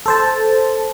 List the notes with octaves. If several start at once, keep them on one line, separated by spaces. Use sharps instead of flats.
A4 C5 A5